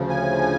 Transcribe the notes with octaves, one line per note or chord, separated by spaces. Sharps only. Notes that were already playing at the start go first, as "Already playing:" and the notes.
Already playing: D2 C#3 F3
G#5